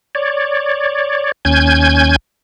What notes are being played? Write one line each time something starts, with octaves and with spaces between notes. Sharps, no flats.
C#5 D5
D#2 C#4 G#5 G6 G#6